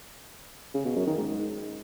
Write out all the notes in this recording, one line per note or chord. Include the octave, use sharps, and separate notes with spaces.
C#3
B2
F#2
D#3
G#2